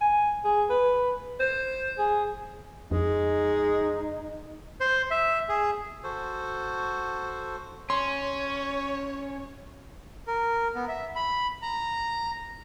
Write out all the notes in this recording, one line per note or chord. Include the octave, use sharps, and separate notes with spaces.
G#5
G#4
B4
C5
G#4
F2 G#3 D#4
C5
E5
G#4
F#4 A4 C5
C#4 C#5 C6
A#4
B3
E5
B5
A#5